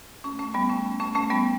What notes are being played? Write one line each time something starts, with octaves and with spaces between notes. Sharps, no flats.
A3 C#4
A3 C#4
G3 B3
A3 C#4
A3 C#4
A3 C#4
G3 B3